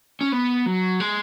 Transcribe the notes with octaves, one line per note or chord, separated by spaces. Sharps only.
C#4
B3
F#3
G#3